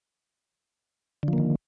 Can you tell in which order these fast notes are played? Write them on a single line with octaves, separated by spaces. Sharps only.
D3 F3 A#3 D#3